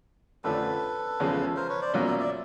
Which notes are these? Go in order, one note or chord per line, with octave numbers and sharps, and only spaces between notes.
F2 D3 F3 A3 C#4 A4 B4
E2 C#3 F3 G#3 C#4
A#4 C5
B4 C#5
C5 D5
B2 F#3 A#3 C#4 F4
D5 E5
D5 E5